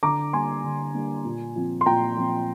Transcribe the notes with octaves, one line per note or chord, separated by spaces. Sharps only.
D3 A#5 D6
G3 A#3 D4 G#5 C6
D3
G3 A#3 D4
A#2
F3 C4
C6
A#2 G5 A#5
F3 C4